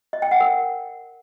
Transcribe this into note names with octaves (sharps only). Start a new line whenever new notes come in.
D#5
G5
F#5
A#4